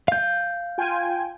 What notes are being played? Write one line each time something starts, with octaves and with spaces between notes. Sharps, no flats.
F5 G6
F4 G5 G#5